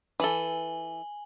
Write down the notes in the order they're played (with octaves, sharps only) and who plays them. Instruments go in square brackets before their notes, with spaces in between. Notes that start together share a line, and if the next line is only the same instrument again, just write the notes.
[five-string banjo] E3 A4 [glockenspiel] G#5 F#7 G7